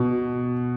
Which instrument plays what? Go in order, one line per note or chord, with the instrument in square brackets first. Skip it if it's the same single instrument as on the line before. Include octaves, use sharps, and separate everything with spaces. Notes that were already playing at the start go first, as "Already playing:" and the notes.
Already playing: [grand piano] B2